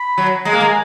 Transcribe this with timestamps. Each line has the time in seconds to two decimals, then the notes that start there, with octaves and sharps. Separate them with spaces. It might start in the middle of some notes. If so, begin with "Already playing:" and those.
Already playing: B5
0.18 F#3
0.45 G#3 A#5
0.53 A#3
0.60 G#3 A#5
0.68 G#5